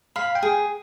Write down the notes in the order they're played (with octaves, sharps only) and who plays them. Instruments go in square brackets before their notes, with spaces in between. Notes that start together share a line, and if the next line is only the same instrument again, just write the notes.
[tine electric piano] F5 [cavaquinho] B5
[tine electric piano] G5
[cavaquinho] G#4